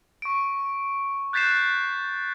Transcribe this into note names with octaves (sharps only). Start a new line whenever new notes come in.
C#6 D7
F#6 G6 A6 B6 C7 E7